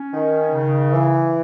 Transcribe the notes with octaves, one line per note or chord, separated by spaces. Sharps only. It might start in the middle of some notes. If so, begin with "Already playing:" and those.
Already playing: C#4
D#3
C#3
E3